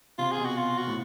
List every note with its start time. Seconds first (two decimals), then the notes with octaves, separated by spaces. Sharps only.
0.18 C3 F4
0.32 G#4
0.38 B2
0.45 F#4
0.57 F4
0.78 F#4
0.87 A2